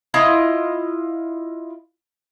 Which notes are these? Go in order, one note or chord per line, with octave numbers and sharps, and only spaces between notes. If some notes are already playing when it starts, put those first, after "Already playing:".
E4 F4 D#5